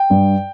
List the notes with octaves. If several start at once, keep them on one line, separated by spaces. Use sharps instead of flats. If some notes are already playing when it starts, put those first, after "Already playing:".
Already playing: G5
G2